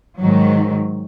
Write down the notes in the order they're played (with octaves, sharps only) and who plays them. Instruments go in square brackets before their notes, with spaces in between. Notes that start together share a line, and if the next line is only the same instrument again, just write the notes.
[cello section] G#2 D#3 F#3